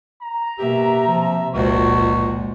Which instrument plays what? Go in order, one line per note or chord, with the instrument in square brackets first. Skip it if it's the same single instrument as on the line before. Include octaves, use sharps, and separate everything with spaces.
[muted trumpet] A#5
[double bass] B2 A#3 [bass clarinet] G4 [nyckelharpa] E5
[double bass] C3 [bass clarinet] F3
[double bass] F1 A#2 [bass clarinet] C#2 [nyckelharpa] F#4 C5 [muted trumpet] C#6